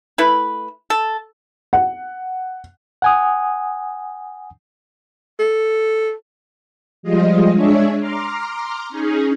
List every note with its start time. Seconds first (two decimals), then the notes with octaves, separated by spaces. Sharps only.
0.18 A3 E4 B4
0.90 A4
1.73 F#5
3.02 F#5 G#5 D#6
5.39 A4
7.03 F3 G3 G#3 F4 D#5
7.55 G#3 D4 G#4 C#5 E5
7.99 A#5 C6 D6 F6
8.89 C#4 D#4 G#4